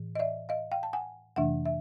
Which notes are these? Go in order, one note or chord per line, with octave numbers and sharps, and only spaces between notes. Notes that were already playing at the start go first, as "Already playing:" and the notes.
Already playing: A2 E3
D#5
D5 E5
D#5 F5
F5 G5
A5
F#5 G#5
F2 C3 E3 A3 D4 E5 F#5
E5